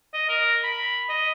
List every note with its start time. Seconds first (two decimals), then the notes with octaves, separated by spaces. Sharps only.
0.14 D#5
0.29 A#4
0.64 B5
1.09 D#5